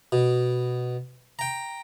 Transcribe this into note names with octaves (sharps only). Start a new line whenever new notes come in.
B2
G5 A#5